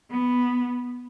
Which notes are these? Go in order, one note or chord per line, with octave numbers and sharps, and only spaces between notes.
B3